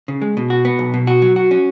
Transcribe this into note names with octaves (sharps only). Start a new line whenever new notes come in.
C#3
G#3
B2
F#4
B3
B1
B2
F#4
F#3
F#4
C#4